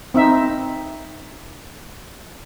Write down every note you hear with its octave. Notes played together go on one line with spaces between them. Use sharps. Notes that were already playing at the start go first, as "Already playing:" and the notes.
C4 D#4 E5